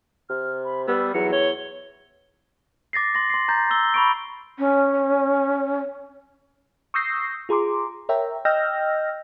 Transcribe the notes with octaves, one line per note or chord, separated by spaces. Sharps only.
C3 F6
B5
G3 B3 E6
E2 F#3 C#7
C#5 G7
D6 A6 A#6 C7
C6 A#6
C6 C7
A#5 G6 A6
E6 G7
B5 C#6 D7
C#4
C#6 D#6 E6 G6 A#6 C7
F4 G#4 A#5 C6 D6
A#4 C#5 E5 G5 A#5
D#5 G5 E6 F6 G6 A#6